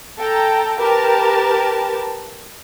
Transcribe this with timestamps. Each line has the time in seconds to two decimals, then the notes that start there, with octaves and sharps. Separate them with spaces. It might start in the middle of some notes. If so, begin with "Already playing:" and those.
0.18 A4 G5 A#5
0.79 G4 A#4 B4 A5